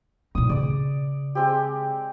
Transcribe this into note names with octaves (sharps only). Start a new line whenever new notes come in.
A#2 D#4 D#6
C#3 D5 D6
G#3 C4 G4